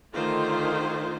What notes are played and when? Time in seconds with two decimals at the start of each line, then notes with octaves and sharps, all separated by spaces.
0.13 D3 D#3 A3 F4 C5